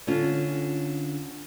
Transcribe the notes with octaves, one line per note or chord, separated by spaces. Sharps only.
D3 C#4 F4